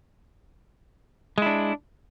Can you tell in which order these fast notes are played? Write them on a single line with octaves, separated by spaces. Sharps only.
G#3 E4 D4